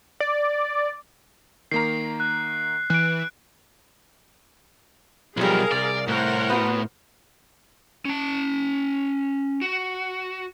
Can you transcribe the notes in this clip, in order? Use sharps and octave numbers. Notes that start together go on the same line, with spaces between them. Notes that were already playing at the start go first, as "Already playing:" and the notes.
D5
D#3 A#3 A#5 C7
F#6
E3 F#6 D7
B1 F3 G3 G#4 A#4 F5
C2 D5
A2 A#4 C5 F#5
B3 F#4
C#4 A5
F#4